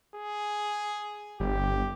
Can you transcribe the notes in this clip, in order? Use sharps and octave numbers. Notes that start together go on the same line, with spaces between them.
G#4
G1 G4